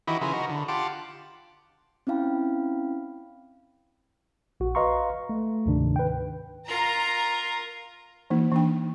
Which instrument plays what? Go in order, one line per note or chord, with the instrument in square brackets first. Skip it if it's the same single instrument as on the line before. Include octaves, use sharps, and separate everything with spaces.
[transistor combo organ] D#3 E3 E4 F#4 G4 D#5
C#3 F3 E4 G#4 A#4 B4
D#4 F#4 A#4
D3
F4 G4 F#5 A5 D6
[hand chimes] C4 C#4 E4 F5 G5 B5
[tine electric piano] A#1 F#4
B4 D#5 F5 A#5 C6 C#6
A3
D2 G#2 C3 D#3 D4
B4 G5
[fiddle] F4 A#4 [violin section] A#5
[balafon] E3 A#3 D#4
E3 D4 G5